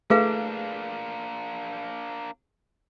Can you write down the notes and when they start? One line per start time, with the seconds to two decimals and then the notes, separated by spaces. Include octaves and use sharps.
0.10 A3 A#3 D4 G#4 B4 F5